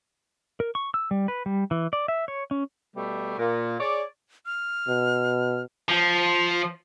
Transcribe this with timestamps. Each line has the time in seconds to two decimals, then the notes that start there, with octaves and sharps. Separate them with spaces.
0.60 A#4
0.75 C#6
0.94 E6
1.11 G3
1.28 B4
1.46 G3
1.71 E3
1.93 D5
2.08 E5
2.28 C#5
2.51 C#4
2.96 B2 G3 A3
3.38 A#2
3.80 G#4 C#5 D5
4.46 F6
4.88 B2
5.89 F3